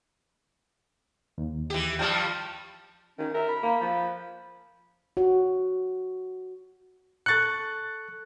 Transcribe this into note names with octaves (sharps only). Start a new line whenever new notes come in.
D#2
E3 G4
G2 F3 G3 G5 A5 F6
D#3 C#4
A#4 E5
B5
A#3
F3
F#4 C#5
A4 C#6 F#6 A6 C#7